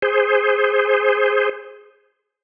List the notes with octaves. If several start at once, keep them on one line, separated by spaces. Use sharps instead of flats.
G#4 C5